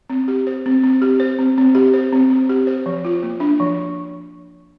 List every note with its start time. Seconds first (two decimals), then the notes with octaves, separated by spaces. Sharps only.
0.10 C4
0.28 G4
0.47 C5
0.66 C4
0.84 C4
1.02 G4
1.20 C5
1.39 C4
1.58 C4
1.75 G4
1.94 C5
2.13 C4
2.30 C4
2.49 G4
2.67 C5
2.86 F3
3.05 F4
3.23 A#3
3.40 D4
3.60 F3